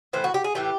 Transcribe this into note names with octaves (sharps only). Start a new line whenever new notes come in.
A2 E3 A3 C5
F#4
G4
G#4
A2 E3 A3 G4